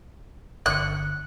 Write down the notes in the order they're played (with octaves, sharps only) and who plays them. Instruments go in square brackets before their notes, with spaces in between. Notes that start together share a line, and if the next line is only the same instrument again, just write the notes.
[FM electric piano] G1 D3 C#7 [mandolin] F#6